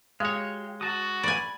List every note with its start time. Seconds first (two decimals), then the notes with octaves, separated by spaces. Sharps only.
0.20 G#3 F#4 G4 C#5 F5
0.81 F#4 F#5 A5 D#6
1.23 D5 G#5 B5